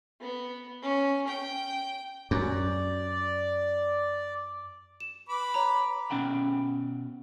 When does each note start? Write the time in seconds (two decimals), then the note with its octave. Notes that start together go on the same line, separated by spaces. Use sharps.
0.21 B3
0.82 C#4
1.27 G5
2.31 F#2 D5
5.00 E7
5.29 B4 B5 D6
5.54 C#5 A#5
6.10 B2 C4 C#4 F#5 G5 B5